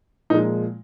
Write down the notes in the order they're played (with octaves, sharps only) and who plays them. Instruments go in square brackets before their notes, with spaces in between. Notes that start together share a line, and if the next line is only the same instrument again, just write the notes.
[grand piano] A#2 F3 G#3 D#4